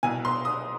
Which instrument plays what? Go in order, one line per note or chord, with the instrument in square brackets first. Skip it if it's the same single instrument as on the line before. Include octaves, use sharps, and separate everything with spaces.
[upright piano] C2 B2 G#5
C6
D#6